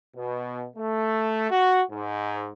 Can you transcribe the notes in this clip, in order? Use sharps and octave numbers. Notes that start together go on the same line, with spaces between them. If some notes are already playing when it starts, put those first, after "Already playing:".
B2
A3
F#4
G#2